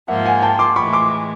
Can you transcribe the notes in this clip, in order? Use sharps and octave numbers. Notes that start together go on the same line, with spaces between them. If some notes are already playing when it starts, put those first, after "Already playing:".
G#2 F3 A#3 E5 F#5
F#5 G#5
G5 A5
C6 D6
A2 E3 G#3 B5 C#6
C6 D6